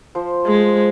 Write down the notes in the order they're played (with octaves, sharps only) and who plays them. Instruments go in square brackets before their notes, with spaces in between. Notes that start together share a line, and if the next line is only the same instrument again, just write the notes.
[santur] F3 C5
[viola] G#3